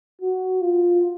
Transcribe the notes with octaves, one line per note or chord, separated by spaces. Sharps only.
F#4
F4